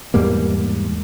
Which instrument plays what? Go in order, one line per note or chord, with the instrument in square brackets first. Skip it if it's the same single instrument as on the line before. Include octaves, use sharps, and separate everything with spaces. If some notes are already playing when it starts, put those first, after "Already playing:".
[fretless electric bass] E2 G#2 G3 A#3